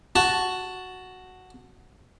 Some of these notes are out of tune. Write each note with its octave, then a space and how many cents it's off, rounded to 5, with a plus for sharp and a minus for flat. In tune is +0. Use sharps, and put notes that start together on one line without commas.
F#4 +0 A5 +0